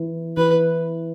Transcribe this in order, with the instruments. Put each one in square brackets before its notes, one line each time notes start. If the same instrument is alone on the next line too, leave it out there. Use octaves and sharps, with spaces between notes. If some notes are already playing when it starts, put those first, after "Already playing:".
Already playing: [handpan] E3
[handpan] E3 [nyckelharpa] B4